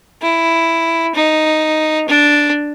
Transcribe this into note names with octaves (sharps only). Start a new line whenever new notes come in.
E4
D#4
D4